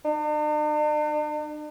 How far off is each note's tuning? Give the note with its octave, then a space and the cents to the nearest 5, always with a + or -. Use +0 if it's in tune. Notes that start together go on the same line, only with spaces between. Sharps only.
D4 +45